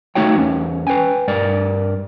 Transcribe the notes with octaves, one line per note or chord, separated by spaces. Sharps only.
A3 D#4 F#4 C#5 G5
E2 C#4
B4 G5 G#5
G2 A#4 D5